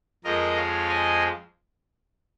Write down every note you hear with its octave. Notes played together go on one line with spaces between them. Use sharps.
F2 F3 G#3 A#4 D#5
C#5 F5
D#5 G#5